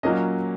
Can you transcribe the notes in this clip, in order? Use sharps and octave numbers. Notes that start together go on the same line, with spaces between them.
A#2 F#3 A#3 C#4 D#5